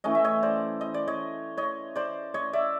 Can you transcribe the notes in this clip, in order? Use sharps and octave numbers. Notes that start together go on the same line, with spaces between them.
E3 A3 C#4 D#5
E5
C#5 D#5
C5 D5
D#5
D5
C#5 D#5
C#5 D#5
C5 D5
C#5 D#5
D5 E5